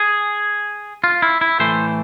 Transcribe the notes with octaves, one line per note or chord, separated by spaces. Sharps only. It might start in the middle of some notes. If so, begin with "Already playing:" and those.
Already playing: G#4
F4
E4
E4
A2 E3 A3 C5